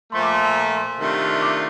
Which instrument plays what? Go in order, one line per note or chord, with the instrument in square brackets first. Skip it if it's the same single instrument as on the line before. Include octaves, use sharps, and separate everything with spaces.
[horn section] A#2 F3 A3 [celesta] C6
[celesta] D6
C6
A5
A#5
C6
[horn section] C3 D#3 A3 D4 F4
[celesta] D6